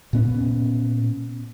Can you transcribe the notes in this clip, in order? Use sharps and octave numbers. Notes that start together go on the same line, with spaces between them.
A#2 B3 C#4